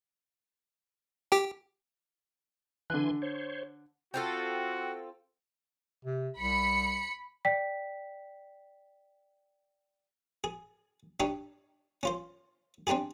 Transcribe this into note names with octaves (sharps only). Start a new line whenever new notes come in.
G4 G5
D3 E3 G#5 C6 F#6
C5 C#5
C4 F4 F#4 A4 G5
C3
C2 B5 C#7
D5 G5 B6
G#4
D4 D#4 G4 C#5
C#4 F4 C5
C4 D4 D#4 G4 G#4